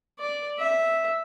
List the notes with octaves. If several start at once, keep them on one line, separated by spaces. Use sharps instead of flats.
D5
E5